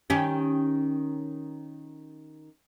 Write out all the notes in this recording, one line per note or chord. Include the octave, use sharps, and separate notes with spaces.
D#3 C#4 G4